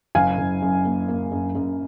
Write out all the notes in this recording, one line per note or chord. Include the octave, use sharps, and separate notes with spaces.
F#1 F5 G#5
F#1
F#2
A#3
A#3
F#2
F#2